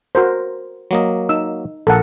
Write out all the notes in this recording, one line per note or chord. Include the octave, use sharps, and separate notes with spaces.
F#4 A#4 C5
F#3 A#3 D#5
D#4 E6
A#1 A4 A#4 F#5